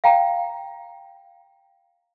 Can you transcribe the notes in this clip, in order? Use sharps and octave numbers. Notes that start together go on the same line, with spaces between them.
F5 G5 A#5